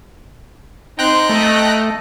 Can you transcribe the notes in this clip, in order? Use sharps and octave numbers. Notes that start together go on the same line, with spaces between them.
C4 D#4 G5 A#5 C6 F#6
A3 A4 D#5